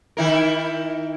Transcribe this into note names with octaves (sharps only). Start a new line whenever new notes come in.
D#3 E4 A#4